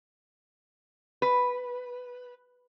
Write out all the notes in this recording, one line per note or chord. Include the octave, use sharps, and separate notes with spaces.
B4